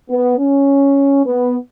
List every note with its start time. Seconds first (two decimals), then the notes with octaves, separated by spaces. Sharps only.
0.10 B3
0.39 C#4
1.26 B3